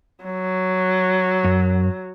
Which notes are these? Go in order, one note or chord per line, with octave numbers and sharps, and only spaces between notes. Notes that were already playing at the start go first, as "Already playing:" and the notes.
F#3
F#2